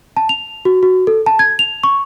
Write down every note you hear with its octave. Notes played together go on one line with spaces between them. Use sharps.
A5
F7
F#4
F#4
A4
A5
G#6
F7
C#6